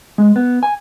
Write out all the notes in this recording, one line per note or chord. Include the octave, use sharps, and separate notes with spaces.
G#3
B3
G#5